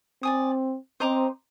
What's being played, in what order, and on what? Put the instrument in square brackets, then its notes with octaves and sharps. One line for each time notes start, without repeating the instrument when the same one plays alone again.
[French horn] C4 [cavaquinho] D5 G#5 D#6
[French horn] C4 [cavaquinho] C5 D#5 A#5 D6